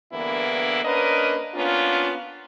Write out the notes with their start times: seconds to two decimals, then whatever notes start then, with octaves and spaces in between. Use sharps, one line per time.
0.13 G2 D3 E3 A#3 B3 E4
0.85 A#3 C#4 D4 A#4 B4 D#5
1.55 A#3 B3 C#4 D4 F4